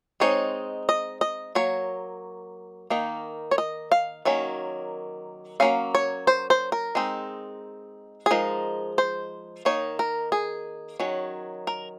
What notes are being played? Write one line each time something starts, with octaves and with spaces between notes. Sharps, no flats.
G#3 C4 D#4 C#5
D#5
D#5
F#3 A#3 C#5
D#3 A#3 D#4
C#5
D#5
F5
D#3 F#3 A#3 C#4
F#3 A#3 C#4 F5
C#5
C5
C5
A#4
G#3 C4 D#4
G#4
F3 G#3 D#4 A#4
C5
D#3 A#3 D#4 C#5
A#4
G#4
D#3 F#3 C#4
A#4